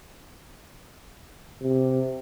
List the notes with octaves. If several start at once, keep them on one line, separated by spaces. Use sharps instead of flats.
C3